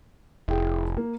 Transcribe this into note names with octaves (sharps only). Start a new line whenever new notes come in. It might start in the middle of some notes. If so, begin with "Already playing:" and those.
F1 E4 G#4 G5
A#3